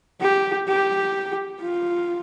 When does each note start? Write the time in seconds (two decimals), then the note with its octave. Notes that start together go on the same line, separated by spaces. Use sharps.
0.21 G4
0.68 G4
1.61 F4